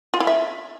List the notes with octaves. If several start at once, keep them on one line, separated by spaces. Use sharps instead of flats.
F4
E4
E5